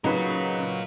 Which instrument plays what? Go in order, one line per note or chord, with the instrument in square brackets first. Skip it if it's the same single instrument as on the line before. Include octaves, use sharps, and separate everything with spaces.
[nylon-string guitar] C#3 [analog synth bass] F#3 [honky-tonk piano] D#4 F#4 B4 [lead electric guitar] F4 A#4